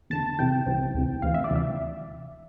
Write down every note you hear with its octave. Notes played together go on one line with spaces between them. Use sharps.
E2 D3 A5
C2 C3 E3 G5
C2 C3 E3
D2 C3 E3
D2 C3 E3 F5
E5
D5
D2 C3 E3 E5